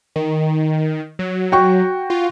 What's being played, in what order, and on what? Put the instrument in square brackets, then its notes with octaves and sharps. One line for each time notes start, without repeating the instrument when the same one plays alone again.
[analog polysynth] D#3
F#3
[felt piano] F#4 G5 C#6
[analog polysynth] F4